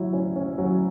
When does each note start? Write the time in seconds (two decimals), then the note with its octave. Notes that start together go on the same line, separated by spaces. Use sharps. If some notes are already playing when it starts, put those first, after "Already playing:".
Already playing: F#3 E4
0.13 C#4
0.36 C#4
0.58 F#3